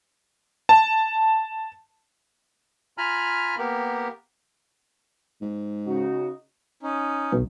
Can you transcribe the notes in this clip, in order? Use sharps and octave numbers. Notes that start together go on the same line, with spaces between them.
A5
F4 G#5 A#5 B5 F6
A#3 B3 G4 A#4
G#2
C#3 D#4 F#4
C#4 D#4
B1